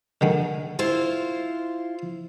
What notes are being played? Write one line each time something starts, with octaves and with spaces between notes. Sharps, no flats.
D3 D#3 G#3
E4 F4 C5